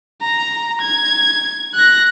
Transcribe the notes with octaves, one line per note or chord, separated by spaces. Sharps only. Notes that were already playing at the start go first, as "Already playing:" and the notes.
A#5
G#6
F#6 A#6